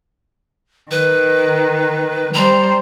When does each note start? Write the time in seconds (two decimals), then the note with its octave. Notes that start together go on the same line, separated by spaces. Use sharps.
0.91 D#3 B4
2.34 G3 C5 A#5